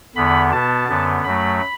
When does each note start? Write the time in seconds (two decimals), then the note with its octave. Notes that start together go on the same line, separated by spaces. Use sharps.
0.16 E2 D3 B3 B5
0.52 B2 B3 A5
0.88 F#2 D3 B3
1.24 F#2 F#3 A3 B5